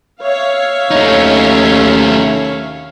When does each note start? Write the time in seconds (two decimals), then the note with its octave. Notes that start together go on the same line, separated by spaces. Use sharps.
0.22 C#5 E5 F5
0.91 D#2 A3 C#4 D#4